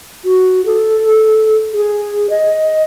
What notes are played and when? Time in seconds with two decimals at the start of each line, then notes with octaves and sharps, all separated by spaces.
0.25 F#4
0.66 A4
1.74 G#4
2.30 D#5